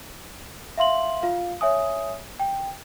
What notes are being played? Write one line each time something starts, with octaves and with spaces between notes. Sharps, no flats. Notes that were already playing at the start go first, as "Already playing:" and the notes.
E5 F5 C6 F#7
F4 F5
C#5 E5 G#5 D#6
G5